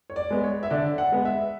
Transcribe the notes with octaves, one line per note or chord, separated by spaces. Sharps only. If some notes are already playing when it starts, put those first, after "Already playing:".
C#5
D5
G#3 B3
C#5
E5
D3 D5
F#5
G#3 B3
E5